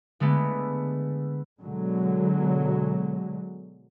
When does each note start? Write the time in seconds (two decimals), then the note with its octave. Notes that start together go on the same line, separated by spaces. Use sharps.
0.20 D3 G#3 A3 B3
1.61 B2 D3 F#3 G#3